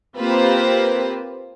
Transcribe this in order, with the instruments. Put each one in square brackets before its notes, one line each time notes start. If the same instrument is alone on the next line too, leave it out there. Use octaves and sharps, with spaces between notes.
[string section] A#3 C4 F4 G4 B4 C5